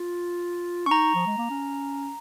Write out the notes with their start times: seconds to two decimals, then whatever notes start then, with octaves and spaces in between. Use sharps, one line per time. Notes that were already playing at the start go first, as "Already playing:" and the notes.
Already playing: F4
0.86 C#4 C#6
0.91 D#4 A#5
1.15 F3
1.26 G#3
1.38 A#3
1.50 C#4